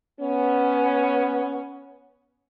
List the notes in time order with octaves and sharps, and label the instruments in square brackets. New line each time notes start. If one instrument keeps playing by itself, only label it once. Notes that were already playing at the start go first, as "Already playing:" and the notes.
[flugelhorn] B3 [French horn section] C#4